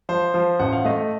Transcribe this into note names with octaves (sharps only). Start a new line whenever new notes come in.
F3 C5
F3
A1 F#5
F5
A3 D#5